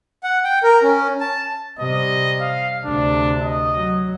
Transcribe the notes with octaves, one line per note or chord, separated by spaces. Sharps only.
F#5
G5
A#4
C#4
A5
C3 G3 D#5
F5
D2 C3 D4
D#5
F#3